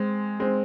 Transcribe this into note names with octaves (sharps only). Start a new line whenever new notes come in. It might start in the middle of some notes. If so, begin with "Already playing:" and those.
Already playing: G#3 C4
G#3 C4